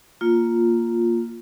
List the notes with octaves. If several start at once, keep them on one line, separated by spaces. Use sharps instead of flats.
A#3 F4